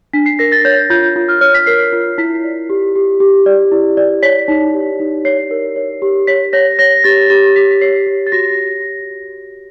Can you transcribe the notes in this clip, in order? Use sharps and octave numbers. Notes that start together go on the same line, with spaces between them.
D4 B6
C7
A#4 A#6
A6
C#5 G6
F4 G6
F4
F6
C#5 F6
B6
A#4 C7
F4
E4 B6
D5
G4
G4
G4
D5
E4
D5
C#5 B6
D#4
G4
D#4
C#5 C7
A#4
C#5
G4
C#5 B6
C#5 A#6
C#5 A#6
G4 A6
G4 A6
G4 B6
B6
C#5 C7
G4
A6
F#4 A#6